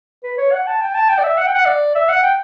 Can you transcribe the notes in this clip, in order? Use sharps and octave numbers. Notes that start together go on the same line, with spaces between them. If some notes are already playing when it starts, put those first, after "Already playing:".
B4
C#5
F#5
A5
G5
A5
G5
D5
E5
F#5
G5
F#5
D5
E5
F#5
G5